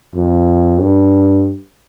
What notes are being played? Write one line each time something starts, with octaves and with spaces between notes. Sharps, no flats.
F2
G2